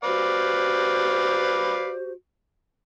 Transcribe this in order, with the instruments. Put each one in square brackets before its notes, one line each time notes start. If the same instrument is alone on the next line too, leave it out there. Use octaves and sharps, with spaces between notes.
[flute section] F#4 G4 C5 [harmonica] B4 D5 F5